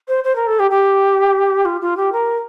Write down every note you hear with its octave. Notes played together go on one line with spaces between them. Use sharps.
C5
C5
A#4
A4
G4
G4
F4
F4
G4
A#4